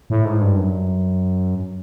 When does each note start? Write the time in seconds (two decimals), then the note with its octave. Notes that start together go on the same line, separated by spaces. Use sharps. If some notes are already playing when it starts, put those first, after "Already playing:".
0.10 A2
0.25 G#2
0.41 G2
0.57 F#2